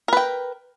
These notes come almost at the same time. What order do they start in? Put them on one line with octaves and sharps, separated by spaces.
A#4 B4 G5